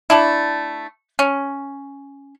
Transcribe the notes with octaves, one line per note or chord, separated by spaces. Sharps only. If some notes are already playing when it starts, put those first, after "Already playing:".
A3 D4 E4
C#4